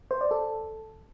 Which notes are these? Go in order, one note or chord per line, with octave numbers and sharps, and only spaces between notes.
C5
D5
A4